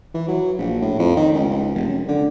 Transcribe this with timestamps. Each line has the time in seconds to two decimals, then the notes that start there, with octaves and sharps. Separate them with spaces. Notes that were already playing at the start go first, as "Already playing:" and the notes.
0.14 E3
0.28 F#3
0.58 A#1
0.82 A2
0.99 F2
1.17 D#3
1.34 C#2
1.50 C#2
1.75 F1
1.88 F#2
2.08 D3